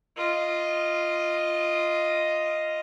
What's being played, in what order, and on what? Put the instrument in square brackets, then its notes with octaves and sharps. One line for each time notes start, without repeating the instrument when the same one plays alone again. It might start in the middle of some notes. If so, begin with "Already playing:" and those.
[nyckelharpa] F4 D#5